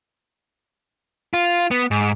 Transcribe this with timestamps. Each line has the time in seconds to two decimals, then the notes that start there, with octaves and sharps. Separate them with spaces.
1.34 F4
1.71 B3
1.91 G#2